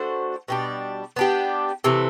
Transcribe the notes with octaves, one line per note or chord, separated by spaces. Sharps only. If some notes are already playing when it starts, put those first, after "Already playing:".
Already playing: A3 D4 F#4 C5
B2 G3 D4
B3 D4 G4
C3 E3 A3